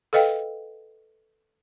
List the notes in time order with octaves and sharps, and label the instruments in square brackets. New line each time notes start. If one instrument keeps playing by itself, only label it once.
[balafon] A4 B4 D#5 F5 G5